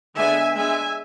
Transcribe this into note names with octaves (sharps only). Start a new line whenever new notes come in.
D3 G#3 B3 D4 E5 G#5
G#3 B3 D4 E5 G#5